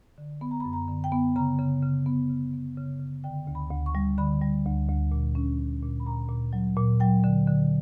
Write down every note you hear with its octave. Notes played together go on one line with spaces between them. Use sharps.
D3
B3 B5
A#5
B5
F#2
A#5
D3
G5
B3
C#3 A#5
C#3
C#3
B3
C#3
B3
C#3
C#3
D3 G5
D2
B5
D2
C#6
G3
D3 B5
G3
D2
D2
A#2
C#4
C#4
A#2
B5
A#2 A#5
A#2
F#3
A#2
F#3 G5
D3
D3